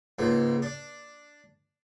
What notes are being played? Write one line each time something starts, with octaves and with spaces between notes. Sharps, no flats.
C#2 G#2 A#3
D4